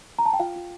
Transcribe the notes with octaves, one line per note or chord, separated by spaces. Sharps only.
A#5
A5
G5
F4 F5
F4